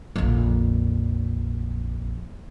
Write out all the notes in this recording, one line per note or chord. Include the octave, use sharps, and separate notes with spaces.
A#1 F2